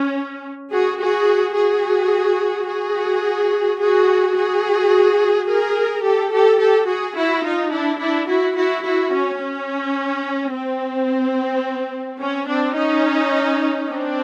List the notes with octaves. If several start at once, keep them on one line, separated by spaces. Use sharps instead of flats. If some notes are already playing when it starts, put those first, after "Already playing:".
Already playing: C#4
F#4 G#4
F#4 G#4
F#4 G#4
F#4 G#4
F#4 G#4
F#4 G#4
G#4 A#4
G4 A4
G4 A4
G4 A4
F#4 G#4
E4 F#4
D#4 F4
D4 E4
D4 E4
E4 F#4
E4 F#4
E4 F#4
C#4
C#4
C4
C#4
C4 D4
C#4 D#4
C4 D4